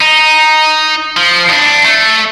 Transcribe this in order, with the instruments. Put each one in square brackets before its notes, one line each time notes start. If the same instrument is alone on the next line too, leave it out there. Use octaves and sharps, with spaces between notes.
[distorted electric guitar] D#4
F3
F2 D4
A3